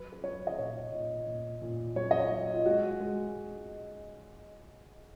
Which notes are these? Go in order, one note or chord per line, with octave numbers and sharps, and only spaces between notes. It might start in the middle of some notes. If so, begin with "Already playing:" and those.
Already playing: F#3 B4
B4
F#3 C#5
D#5
A#2 C#5
A#2
A#2
A#2
F#3 C#5
D#5
C#5
F#3
F4
G#3 F#4
G#3